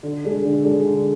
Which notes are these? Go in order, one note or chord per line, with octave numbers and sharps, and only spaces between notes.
D3
G#3 D4
D3
G#3 D4
D3